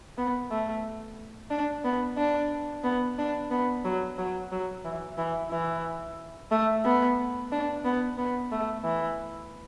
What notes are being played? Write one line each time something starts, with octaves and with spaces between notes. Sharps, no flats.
B3
A3
D4
B3
D4
B3
D4
B3
F#3
F#3
F#3
E3
E3
E3
A3
B3
D4
B3
B3
A3
E3